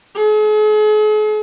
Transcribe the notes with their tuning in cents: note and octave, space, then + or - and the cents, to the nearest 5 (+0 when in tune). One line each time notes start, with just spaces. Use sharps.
G#4 +45